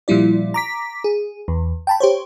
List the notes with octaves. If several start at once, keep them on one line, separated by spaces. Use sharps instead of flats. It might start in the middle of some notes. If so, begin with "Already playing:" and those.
A#2 F3 G3 E4 D5
A#5 D6 B6
G#4
E2
G5 A5 B5
G4 C5 C#5